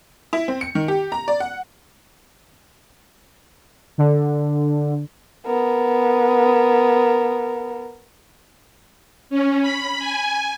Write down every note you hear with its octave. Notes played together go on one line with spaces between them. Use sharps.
E4
C4
C#7
D#3
G4
A#5
D5
F#5
D3
B3 A#4
C#4
B5
G#5